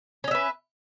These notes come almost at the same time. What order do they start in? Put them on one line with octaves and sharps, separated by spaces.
C#4 D#5 E5 B4